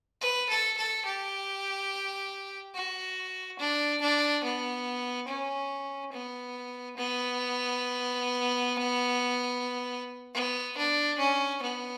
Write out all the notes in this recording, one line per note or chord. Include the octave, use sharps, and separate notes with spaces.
B4
A4
A4
G4
F#4
D4
D4
B3
C#4
B3
B3
B3
D4
C#4
B3